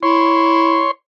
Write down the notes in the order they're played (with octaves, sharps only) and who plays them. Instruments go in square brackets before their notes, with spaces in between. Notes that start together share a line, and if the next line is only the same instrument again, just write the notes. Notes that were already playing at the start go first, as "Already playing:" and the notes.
[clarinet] E4 [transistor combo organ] C#5 C6